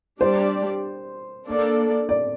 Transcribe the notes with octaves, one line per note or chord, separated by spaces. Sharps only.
G3 D4 G4 C5 D5
A#3 D4 A4 D5
D5